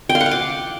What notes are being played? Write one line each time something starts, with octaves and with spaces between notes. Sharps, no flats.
G5
F5
F#5
F5
D6